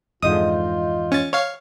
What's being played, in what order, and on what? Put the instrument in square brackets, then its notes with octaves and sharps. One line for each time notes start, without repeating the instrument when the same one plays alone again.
[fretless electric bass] F2 G#2 D3 [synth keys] E3 D#5 G6 [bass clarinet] F4 [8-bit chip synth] D#6
[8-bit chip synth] C#4 A6
C#5 F5